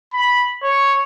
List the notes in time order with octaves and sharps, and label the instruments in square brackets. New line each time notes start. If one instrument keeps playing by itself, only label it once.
[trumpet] B5
C#5